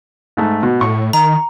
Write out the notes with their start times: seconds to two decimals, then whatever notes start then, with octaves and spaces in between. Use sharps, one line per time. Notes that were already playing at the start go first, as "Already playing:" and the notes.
0.37 G#2 A3
0.63 B2
0.81 A2 C#6
1.13 D#3 A#5